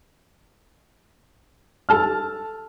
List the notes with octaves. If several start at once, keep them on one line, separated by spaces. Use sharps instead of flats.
A4 A5 F6